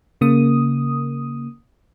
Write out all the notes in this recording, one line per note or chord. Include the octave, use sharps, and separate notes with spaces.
C#3 A#3 D#6